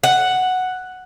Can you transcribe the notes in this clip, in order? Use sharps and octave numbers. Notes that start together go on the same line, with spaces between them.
F#5